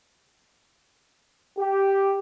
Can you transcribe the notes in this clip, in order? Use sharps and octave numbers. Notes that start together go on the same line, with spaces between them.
G4